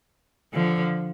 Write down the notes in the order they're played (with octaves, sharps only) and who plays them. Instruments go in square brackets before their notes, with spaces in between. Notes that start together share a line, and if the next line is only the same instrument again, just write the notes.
[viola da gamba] D3 F3